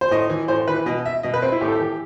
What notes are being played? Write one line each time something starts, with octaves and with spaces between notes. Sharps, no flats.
C5
A2 D#5
E3
A2 C5
E3 B4
B2 D#5
E5
B2 D#5
B4
C4
E4
A2 G4
A4
E3 G4